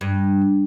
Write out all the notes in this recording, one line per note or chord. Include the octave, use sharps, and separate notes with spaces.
G2